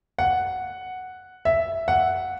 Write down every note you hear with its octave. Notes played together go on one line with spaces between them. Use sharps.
F#5
E5
F#5